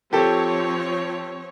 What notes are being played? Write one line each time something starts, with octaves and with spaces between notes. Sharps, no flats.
F3 C4 G4 A4 C#5